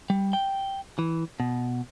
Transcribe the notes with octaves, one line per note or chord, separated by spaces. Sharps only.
G3
G5
E3
B2